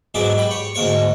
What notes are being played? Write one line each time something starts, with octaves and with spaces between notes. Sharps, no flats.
G#2 B2 F#3 G#4 D5 E5
G4 B5
C#5
D2 G#2 A#3 C#5 C#6